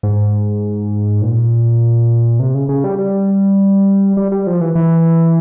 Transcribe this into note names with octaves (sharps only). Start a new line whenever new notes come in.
G#2
A#2
C3
C#3
C#3
G3
G3
G3
G3
F3
E3
E3